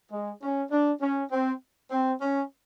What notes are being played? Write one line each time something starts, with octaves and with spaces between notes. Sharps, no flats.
G#3
C#4
D4
C#4
C4
C4
C#4